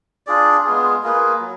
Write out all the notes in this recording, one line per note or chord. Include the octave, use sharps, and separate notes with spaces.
D4 F4 G#4 D5
G#3 B3 F4 G#4
A#3 F4 G#4 B4
F#3